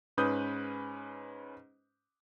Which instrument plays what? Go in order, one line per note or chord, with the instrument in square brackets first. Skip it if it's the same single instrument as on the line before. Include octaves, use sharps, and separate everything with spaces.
[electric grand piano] G#2 C#4 B4 D#6 G6